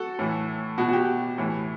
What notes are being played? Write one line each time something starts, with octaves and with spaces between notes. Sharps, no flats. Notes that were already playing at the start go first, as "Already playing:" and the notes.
Already playing: F#4 A4
A2 E3
B2 F#4
F#4
G4
A2 E3